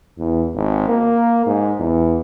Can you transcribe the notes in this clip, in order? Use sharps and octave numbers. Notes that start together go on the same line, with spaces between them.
E2
G#1
A#3
G#2
E2